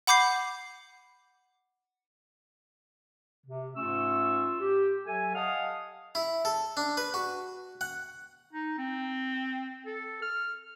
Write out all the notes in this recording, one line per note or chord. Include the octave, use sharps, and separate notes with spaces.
F#5 B5 D6 G6 C7
C3
G#2 A3 C#4 F4 C#6 E6
G4
F#3 A4 E5 G#5
D#5 F5 F#5 A5 D#6 F6
E4
A4
D4
B4
F#4
F#5
D#4
C4
A4
F6